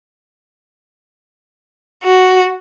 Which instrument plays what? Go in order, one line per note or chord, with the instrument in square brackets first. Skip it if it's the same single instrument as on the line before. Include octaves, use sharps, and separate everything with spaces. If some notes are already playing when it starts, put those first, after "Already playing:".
[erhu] F#4